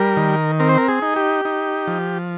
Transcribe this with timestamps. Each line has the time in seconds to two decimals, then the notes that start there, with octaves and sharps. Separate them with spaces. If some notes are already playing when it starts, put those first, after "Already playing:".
Already playing: G3 A#4
0.17 D#3
0.60 C4 A#4
0.69 C5
0.78 A#4
0.88 G#4
1.02 D#4
1.16 G4
1.45 D#4
1.87 F3